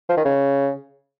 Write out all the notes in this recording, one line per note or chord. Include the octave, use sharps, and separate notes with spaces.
F3
D#3
C#3